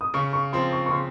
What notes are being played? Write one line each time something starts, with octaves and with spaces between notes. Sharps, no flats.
D#6
C#3 C#6
C#6
F3 C4 C6
C#6
C#6
C#3 C6